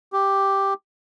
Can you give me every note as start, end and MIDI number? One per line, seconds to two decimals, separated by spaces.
0.13 0.74 67